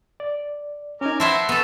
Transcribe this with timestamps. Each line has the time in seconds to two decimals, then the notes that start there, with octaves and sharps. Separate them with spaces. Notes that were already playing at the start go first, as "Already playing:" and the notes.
0.20 D5
1.01 C#4 D#4 A#4 G#5 D6
1.20 C4 E4 F#4 B4 E5 A5 C6
1.49 A3 B3 A4